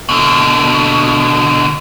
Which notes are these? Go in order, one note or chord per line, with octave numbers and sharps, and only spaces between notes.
B2 D3